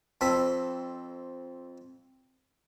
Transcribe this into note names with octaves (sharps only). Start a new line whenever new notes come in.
F2 C4 A4 B5